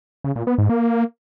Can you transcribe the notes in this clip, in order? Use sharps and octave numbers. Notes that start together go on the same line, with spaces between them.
C#3
A#2
B3
G#2
A#3